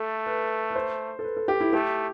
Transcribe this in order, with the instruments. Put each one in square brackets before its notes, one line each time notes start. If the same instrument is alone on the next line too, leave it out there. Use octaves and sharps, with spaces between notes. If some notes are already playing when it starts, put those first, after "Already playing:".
Already playing: [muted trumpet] A3 [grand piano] A4
[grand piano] B4
B4
C5
A4
B4
A4
G4
E4
[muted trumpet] A3 [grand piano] G4